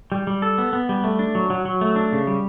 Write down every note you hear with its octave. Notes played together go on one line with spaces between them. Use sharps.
G3
G3
A4
B3
B3
G3
A3
D4
F#3
F#3
F#3
A3
D4
C#3
G3